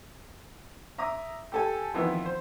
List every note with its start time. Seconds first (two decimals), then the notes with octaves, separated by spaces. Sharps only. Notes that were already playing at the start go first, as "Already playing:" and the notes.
0.98 E5 A#5 D6 D#6
1.52 G4 A4 G#5
1.94 F2 D#3 E3 B3
2.26 C5